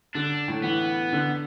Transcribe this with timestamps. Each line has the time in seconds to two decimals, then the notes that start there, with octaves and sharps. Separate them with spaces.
0.15 D3 D4
0.48 A2
0.64 E3 B3
1.13 D3